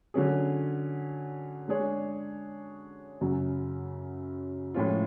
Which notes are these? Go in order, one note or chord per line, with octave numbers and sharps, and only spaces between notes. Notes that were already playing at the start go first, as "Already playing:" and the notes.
D3 F#3 C#4 G#4
G#3 D4 G#4 C#5
F#2 C#3 F#3
A2 F3 G#3 C#4 F4